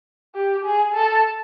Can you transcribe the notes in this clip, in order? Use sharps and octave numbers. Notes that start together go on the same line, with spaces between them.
G4
G#4
A4